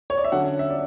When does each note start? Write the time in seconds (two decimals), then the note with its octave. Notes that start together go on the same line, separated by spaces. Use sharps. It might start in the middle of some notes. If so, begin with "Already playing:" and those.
0.10 C#5
0.18 D5
0.24 E5
0.32 D3 F#3 C#4 F#5
0.59 E5
0.70 D5